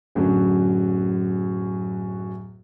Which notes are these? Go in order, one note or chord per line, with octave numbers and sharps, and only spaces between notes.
D1 F#2 D3 F#3